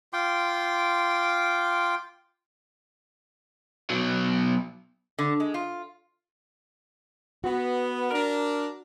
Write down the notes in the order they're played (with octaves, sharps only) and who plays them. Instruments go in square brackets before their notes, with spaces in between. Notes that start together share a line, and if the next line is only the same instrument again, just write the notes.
[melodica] F4 G5 C6 D6
[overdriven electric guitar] B2 F#3
[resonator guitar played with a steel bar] D3
G#3
F4
[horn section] B3 [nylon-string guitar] F#4
[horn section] D4 A#4